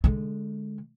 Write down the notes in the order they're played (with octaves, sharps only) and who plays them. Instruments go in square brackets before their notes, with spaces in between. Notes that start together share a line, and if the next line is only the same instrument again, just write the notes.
[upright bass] D3 G#3